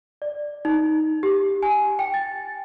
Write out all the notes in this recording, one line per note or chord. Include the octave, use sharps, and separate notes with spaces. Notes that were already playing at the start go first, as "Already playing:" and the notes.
D5
D#4
G4
G#5
G5
A6